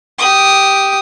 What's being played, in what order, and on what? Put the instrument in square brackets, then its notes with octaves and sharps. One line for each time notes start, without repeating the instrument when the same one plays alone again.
[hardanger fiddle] G4 D#6